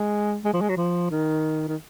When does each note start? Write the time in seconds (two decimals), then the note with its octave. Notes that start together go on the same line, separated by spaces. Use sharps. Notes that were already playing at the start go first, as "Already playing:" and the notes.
Already playing: G#3
0.45 G#3
0.53 F3
0.61 G#3
0.69 F#3
0.77 F3
1.11 D#3
1.68 D#3